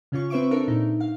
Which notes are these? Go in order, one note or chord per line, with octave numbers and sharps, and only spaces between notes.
C#3 C#4 F4 C#6
C4 B4 C5 E5 C#6 D7
D4 A4 A#4 E5
A#2 D#4
F5